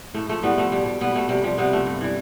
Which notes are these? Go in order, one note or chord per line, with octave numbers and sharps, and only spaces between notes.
A2 A3
F3 A3
A2 G3 B3
F3 A3
B2 G3
G3
B2 G3 B3
G3 A3
C3 G3
F3 G3
C3 G3 B3
F3 A3
G2
E3 G3